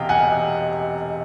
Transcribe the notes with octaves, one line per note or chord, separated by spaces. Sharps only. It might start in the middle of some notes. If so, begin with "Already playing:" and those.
Already playing: E1 E2 C3 D#5 F5 G5
F#5 G#5